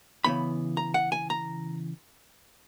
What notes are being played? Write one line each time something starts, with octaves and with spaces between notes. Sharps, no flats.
C#3 E3 B3 B5
A#5
F#5
G#5
A#5